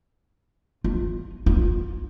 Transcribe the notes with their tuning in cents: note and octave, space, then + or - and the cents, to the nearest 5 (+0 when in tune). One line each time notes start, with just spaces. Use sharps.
F4 +25
F4 +20